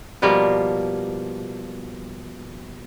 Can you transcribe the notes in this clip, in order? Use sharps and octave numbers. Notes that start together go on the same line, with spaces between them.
B2 F3 G3 A#3